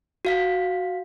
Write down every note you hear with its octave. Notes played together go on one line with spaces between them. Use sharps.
F#4 F5 B6